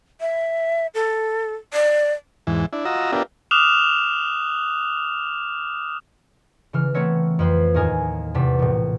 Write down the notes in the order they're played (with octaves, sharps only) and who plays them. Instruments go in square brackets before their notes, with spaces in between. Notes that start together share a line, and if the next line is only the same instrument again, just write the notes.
[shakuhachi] E5
A4
D5
[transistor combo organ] E2 G#2 E3
D4 E4
F4 F#4 D#5 A#5 E6
B3 D4 F4 G4 A#4 E5
[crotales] D6 D#6 F6 F#6 E7 F7
[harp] C#3 E3 F6
A3 B3 C4 A#4 C#5 E5
F2 B4 C5
D#2 A2 A4 A#4 G#5 D#6
E2 C3 A5 B6
A#1 A2